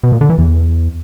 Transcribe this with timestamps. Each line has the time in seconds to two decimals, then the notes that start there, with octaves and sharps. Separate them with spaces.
0.03 B2
0.12 A#2
0.21 D3
0.30 E3
0.38 E2